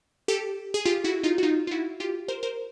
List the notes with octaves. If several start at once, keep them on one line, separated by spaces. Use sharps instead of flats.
G4 A4
G#4
F4 G4
E4 F#4
D#4 F4
F#4
D#4 F4
F4
E4 F#4
F4 G4
A#4 C5
A#4 C5